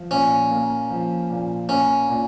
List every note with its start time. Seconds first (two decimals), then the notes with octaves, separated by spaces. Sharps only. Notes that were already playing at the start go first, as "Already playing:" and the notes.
Already playing: F3
0.11 A#2 C#4
0.51 A#3
0.91 F3
1.30 A#2
1.69 A#3 C#4
2.09 A#2